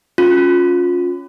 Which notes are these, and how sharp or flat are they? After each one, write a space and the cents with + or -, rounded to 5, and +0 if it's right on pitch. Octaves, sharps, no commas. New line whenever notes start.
C#4 +10 F4 +25